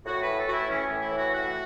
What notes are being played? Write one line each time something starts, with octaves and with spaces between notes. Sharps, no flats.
A2 F#4
E3 B4
A4
A2 F#4
E4
E3 C#4
A2
E4
E3
F#4
A2 F#4